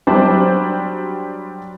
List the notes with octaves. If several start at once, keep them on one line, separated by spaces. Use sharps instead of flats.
F#3 G3 D4 C5